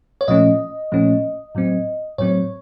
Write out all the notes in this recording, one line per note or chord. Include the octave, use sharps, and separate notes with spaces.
C#5
A#2 F3 A3 C#4 D#5
A#2 F3 A3 C#4
A2 F#3 C4
A2 F#3 C4 C#5